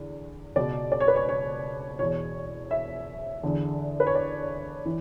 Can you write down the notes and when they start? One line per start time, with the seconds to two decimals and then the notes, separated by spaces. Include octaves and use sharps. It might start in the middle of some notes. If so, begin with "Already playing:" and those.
Already playing: E2 D3
0.56 C#2 B2 D5
0.92 D5
1.00 C#5
1.08 B4
1.16 C#5
1.29 C#5
1.99 E2 B2 C#5
2.71 E5
3.43 E2 D3
4.00 B4
4.07 C#5
4.15 D5
4.86 E3